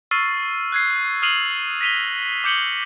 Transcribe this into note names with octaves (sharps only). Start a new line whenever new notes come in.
C#6 E6 F6 A6 C7 D#7
F#6 G#6 C7
D#6 F6 C7 D#7 F7 F#7
A#6 B6 D#7 F7 G7
D6 G6 C#7 F#7 G7